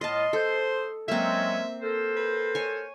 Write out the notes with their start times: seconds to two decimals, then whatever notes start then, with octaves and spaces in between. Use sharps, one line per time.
0.01 A2 G#3 F4 D#5 A5 C6
0.33 A4 C5
1.08 F#3 G#3 A#3 C4 C#4 E5
1.81 A4 A#4 C5
2.17 B4
2.55 C#5 G#5